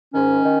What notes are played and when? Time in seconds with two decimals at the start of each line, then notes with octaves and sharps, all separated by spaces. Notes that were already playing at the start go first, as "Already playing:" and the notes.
0.14 G#2 D#3 C#4
0.44 D#3